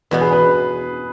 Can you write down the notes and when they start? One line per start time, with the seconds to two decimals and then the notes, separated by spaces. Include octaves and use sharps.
0.11 E2 B2 B3 B4
0.21 G#4
0.33 B4